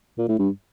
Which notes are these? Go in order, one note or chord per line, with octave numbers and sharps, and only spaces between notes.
A#2
A2
G2